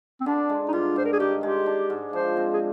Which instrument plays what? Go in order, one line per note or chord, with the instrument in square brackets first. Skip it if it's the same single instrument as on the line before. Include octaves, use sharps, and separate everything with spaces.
[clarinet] C4
[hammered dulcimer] D3 [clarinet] D4
[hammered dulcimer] G#3
[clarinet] D#4
[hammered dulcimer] G2 [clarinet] F4
[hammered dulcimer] G2 [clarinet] C5
[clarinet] A#4
G#4
[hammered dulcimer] D#3 [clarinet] G4
[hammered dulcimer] G#3 [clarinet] G4
[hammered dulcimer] D4
G#2
[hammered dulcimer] F3 [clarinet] C5
[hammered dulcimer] C4
[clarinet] G#4